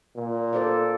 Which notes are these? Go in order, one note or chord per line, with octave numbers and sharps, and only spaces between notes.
A#2
A4 C5 D5